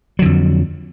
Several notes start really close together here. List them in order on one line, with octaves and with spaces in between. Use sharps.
F#3 D3 F2